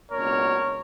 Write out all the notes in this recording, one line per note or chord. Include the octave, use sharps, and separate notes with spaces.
C#2 B2 A#3 D4 A#4 C#5